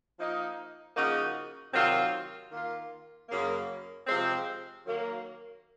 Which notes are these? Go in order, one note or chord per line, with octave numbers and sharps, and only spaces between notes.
F3 A#3 D#4
C#3 F3 A#3 D#4 F#4
C3 D#3 F#3 C4 F4
D#3 A#3 F4
F#2 C#3 F#3 A#3
C3 F3 G#3 C4
D#3 F#3 A#3